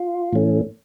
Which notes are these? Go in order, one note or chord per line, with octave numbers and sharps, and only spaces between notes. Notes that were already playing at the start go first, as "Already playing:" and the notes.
Already playing: F4
A2 E3 A3 C#4